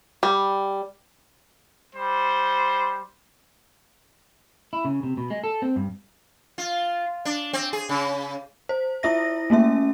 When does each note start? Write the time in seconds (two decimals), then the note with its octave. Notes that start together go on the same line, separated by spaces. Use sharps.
0.23 G3
1.95 G3 C5
4.73 E4
4.85 C#3
5.03 C3
5.17 B2
5.30 G#3
5.44 A4
5.62 C4
5.76 G2
6.58 F4
7.25 D4
7.53 C4
7.73 G#4
7.89 C#3
8.69 C5
9.03 E4 F4 E5 A#6
9.50 A3 A#3 C#4 E5